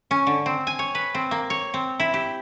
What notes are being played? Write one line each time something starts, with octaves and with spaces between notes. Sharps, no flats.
C#4
D3
C4
G#5
C#5
B4
C4
A#3
C#5
C4
E4
G4